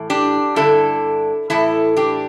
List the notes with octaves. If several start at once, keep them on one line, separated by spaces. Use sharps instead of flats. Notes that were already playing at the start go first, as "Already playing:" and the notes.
Already playing: A2 E3
D4 G4
G2 D3 E4 A4
A2 E3 E4 A4
D4 G4